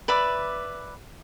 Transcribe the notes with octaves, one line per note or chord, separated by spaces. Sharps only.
B4 D5 E5 D6